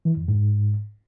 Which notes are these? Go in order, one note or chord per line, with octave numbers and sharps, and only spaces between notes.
E3
F2
G#2